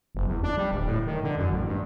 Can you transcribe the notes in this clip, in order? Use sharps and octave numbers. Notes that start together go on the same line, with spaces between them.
F#1
E2
D4
G3
D1
A2
D#3
D3
F#2
A1
G2